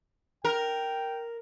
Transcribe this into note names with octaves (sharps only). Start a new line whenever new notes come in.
A#4 G5